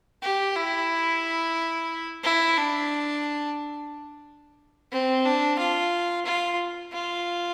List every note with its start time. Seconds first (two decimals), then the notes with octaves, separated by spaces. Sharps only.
0.22 G4
0.56 E4
2.24 E4
2.57 D4
4.92 C4
5.25 D4
5.59 F4
6.26 F4
6.93 F4